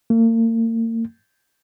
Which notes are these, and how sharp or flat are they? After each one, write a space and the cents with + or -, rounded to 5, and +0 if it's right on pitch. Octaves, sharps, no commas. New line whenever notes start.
A#3 -40